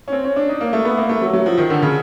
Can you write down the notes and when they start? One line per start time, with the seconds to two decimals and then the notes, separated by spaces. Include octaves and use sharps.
0.08 C#4
0.12 C4
0.24 C#4
0.36 D4
0.49 D#4
0.61 A#3
0.73 A3
0.85 B3
0.97 A#3
1.09 A3
1.21 F#3
1.33 F#3
1.46 F3
1.58 D#3
1.70 D3
1.82 C#3